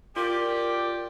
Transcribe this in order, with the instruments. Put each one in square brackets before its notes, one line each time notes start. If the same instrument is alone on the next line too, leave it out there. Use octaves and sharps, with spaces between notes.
[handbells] F4 [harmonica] G4 D5 [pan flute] A#4